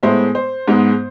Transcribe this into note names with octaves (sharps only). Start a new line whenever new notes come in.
A2 G#3 B3 C5 E5
C5
G#2 G#3 B3